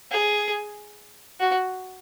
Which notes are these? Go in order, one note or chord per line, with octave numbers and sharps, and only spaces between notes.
G#4
F#4